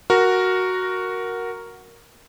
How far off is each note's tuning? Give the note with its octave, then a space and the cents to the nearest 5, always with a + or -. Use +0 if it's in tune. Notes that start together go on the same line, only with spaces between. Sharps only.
F#4 +0 A#4 +0